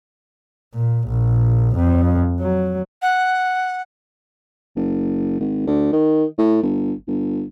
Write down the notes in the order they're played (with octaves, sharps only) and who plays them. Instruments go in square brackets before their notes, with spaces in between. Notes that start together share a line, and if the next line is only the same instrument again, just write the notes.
[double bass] A#2
A#1
F2
F#3
[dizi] F#5
[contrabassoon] F#1
G#1
D2
D#3
A2
G1
G1